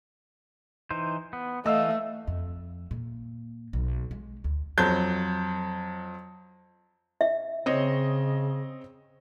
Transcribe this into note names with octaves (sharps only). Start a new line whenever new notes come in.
E3 D#4 C5
B3
E3 A3 D#5 F5 E6
F2
A#2
B1
G#3
D2
F2 F#3 G6
E5
C#3 C4 C#5 D#5